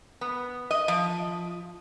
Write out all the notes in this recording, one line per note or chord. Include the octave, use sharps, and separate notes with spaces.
B3
D#5
F3